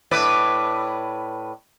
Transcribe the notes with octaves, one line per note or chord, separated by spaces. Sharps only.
A2 B4 D5